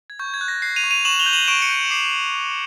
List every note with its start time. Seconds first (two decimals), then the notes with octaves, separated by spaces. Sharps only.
0.10 G#6
0.19 C#6 G6
0.34 G#6
0.41 F#6
0.48 A#6
0.62 F#6 C7
0.76 D#7 F7
0.84 C#6
0.91 D#7 F7
1.05 C#6 E7 F#7
1.20 F7 G7
1.26 G6
1.33 E7 F#7
1.48 C#6 D7 E7
1.62 C#7 D#7
1.69 G6
1.90 D6 C7